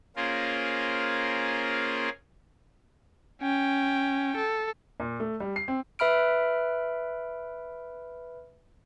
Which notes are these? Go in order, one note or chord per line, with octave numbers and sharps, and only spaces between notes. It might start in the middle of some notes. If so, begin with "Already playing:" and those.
A#3 C#4 F4 G#4 A#4 C5
C#4 G5
A4
A#2
A3
G3
C7
C4
B4 E5 B5 F6 D7